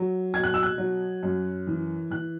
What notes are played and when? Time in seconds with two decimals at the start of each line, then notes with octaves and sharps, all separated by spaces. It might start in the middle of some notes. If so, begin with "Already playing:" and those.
Already playing: F#3
0.34 B2 G#6
0.43 F#6
0.54 E6
0.63 F#6
0.78 F#3
1.23 F#2
1.67 E3
2.11 E3 F#6